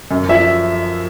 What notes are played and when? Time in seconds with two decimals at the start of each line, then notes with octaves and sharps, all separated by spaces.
0.11 F#2
0.29 F3 E5